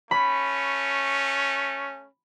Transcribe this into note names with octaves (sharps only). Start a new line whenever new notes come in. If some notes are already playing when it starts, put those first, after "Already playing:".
A3 C#4 B5